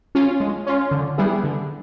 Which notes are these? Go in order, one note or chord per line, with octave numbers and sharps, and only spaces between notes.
C#4 F4
G#3
C#4 F4
D3
G3 B3 E4 G#4
D3